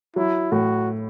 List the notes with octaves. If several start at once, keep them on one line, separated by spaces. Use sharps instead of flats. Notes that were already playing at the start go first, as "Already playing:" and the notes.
F#3 E4
A2 F#4